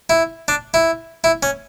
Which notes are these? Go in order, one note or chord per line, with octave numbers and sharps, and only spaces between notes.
E4
D4
E4
E4
C#4